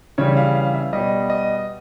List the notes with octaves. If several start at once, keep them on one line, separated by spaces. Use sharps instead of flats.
C#3 E3 G3 C#5
F5
F5
E5
B2 G3 D#5
D#5